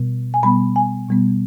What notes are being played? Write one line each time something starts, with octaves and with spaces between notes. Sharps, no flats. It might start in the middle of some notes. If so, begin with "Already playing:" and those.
Already playing: B2 G3 B3
G#5
B2 G3 B3 B5
G#5
B2 G3 B3